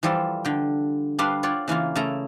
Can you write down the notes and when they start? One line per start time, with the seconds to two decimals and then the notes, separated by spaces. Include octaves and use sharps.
0.03 E3 F3 G3 F4 A4
0.45 D3 G5
1.19 G3 D4 B4 F5 C6
1.43 F4 C#5 D5 F#5 G5
1.68 C#3 E3 A#3 F4
1.95 C#3 A3 E4 A4 A#5